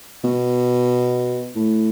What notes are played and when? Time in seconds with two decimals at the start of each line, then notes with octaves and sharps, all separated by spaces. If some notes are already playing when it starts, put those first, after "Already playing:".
0.24 B2
1.56 A2